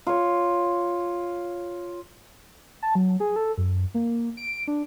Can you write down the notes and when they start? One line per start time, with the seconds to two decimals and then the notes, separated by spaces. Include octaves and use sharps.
0.07 F4 C#5
2.83 A5
2.95 F#3
3.20 G#4
3.36 A4
3.58 F#2
3.94 A#3
4.37 D7
4.68 D4